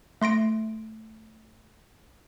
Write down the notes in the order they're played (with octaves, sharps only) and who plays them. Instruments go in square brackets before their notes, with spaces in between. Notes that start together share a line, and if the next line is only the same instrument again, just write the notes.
[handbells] A3 C6 A#6 D7